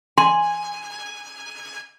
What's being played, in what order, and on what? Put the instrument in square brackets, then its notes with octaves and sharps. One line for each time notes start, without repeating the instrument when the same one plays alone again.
[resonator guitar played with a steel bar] G#5 [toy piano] C6